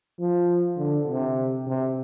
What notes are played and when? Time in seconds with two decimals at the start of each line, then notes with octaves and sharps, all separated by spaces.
0.19 F3
0.78 D3
1.08 C3
1.67 C3